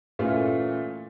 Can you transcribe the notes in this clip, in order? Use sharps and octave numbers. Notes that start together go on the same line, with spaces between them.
A#2 E3 A3 C#4 F4